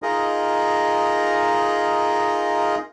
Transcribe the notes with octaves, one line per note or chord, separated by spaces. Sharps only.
D#4 F4 G#4 A#4 D#5